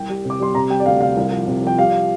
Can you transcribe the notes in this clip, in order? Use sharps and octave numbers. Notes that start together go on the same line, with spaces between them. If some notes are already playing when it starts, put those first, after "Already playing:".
Already playing: C2 G5
G3
C3
D6
G3 C6
C3 A#5
G3 G5
D5
D2 F5
C3 F5
C2
F3
C3
F3 G5
G3 F5